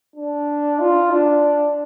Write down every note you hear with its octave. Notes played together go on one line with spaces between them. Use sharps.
D4
F4
D4